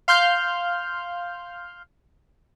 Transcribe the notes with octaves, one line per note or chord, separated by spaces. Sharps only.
F5 C6 F6 G6